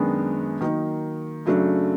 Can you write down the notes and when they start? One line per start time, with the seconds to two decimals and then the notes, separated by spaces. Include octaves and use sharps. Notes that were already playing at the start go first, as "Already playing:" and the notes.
Already playing: F#2 D#3 G#3 B3 D4
0.61 D#3 F#3 A#3 D#4
1.46 F#2 C#3 F#3 A3 D4